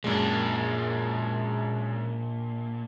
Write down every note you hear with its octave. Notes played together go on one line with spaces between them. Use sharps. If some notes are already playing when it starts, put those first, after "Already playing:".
F#2 A#2 G#3 D4